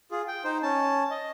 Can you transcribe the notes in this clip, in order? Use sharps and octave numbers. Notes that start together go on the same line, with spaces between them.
F4 G#4
G5
D#4 C5
C#4 A5
D#5